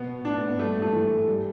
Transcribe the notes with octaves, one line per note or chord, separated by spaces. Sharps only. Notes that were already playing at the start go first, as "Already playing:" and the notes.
Already playing: B2 B3
A2 D4
B3
B3
G2 A3
A3
E3
G3